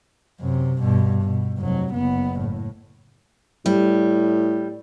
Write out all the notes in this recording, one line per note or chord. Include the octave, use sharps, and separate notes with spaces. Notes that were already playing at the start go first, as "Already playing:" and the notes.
F#2 C3
G2 B2
B2
F1 F#3
F#1 B3
A2
A2 G3